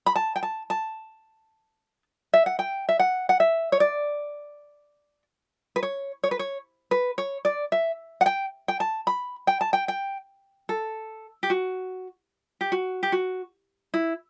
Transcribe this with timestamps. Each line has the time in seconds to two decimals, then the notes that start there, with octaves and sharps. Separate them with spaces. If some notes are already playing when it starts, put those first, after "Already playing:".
0.06 B5
0.16 A5
0.36 G5
0.43 A5
0.70 A5
2.33 E5
2.46 F#5
2.59 G5
2.89 E5
2.99 F#5
3.29 F#5
3.40 E5
3.72 C#5
3.80 D5
5.76 B4
5.83 C#5
6.23 C#5
6.31 B4
6.39 C#5
6.91 B4
7.18 C#5
7.45 D5
7.72 E5
8.21 F#5
8.26 G5
8.68 G5
8.80 A5
9.07 B5
9.47 G5
9.61 A5
9.73 G5
9.88 G5
10.69 A4
11.43 G4
11.50 F#4
12.61 G4
12.72 F#4
13.03 G4
13.12 F#4
13.94 E4